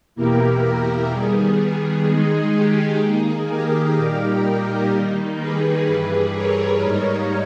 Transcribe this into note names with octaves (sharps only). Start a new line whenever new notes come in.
E2 B2 A#3 E4 G4 A#4
G4 A#4
D#3 G3 B3 G#4
D#3 G#3 D#4 G#4
G4
D#3 A#3 D#4 G#4
G4 A#4
A#2 G3 A#3 D#4
D#3 G3 A#3 D#4
G#4 B4
G2 E3 G3
A#4 C#5
G#2 G3 A#3 D#4